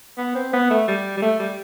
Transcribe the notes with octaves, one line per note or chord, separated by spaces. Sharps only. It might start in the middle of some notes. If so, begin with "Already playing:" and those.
B3
C4
B3
A3
G3
G3
A3
G3